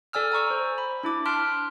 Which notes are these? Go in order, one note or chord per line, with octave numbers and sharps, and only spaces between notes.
A4 D5 G#5 E6 F6
G#5 A#5 C#6 E6
C5
B5
D4 E4 D6
A5 C6 F6 F#6 B6 D7